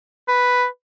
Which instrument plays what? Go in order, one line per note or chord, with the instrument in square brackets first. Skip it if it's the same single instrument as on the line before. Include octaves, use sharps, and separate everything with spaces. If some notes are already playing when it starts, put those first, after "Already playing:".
[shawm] B4